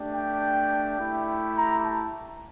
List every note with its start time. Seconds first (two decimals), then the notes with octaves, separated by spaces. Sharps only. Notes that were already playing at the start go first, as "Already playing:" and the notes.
Already playing: A3 D4 G4
0.14 G5
0.99 A3 E4 G4
1.56 A#5
1.84 A5